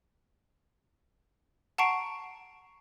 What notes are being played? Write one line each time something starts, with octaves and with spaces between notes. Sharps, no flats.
F#5 A5 A#5 C#6 C7 D7